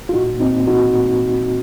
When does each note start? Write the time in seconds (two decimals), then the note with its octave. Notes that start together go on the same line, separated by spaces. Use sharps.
0.09 F4
0.14 A#2 D#4 F#4
0.34 A#2
0.40 C4 D#4
0.54 A#2
0.67 D#4 F#4
0.74 A#2
0.93 A#2